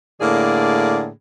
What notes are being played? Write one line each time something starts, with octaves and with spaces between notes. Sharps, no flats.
A2 D3 A#3 G#4 D5